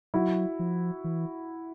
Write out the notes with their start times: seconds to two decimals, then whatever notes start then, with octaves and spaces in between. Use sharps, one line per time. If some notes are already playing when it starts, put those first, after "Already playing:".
0.14 F#3 E4 F#4
0.59 F3
1.04 E3